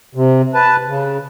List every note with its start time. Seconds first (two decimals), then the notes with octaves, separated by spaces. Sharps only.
0.15 C3
0.54 B4 A5
0.88 C#3